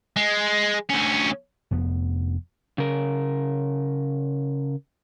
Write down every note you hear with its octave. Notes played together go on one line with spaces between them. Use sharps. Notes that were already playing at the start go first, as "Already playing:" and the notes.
G#3
D2 C#4
F1 F2 B3
C#3 A#4